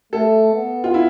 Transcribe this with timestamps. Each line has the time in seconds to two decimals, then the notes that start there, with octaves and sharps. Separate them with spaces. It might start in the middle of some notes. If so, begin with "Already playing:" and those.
0.13 A3 A4
0.54 B3
0.84 F4
0.94 E4